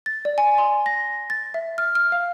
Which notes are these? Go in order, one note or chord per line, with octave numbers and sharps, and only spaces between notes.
A6
D5
G#5
C6
A#6
A6
E5
F6
F6
F5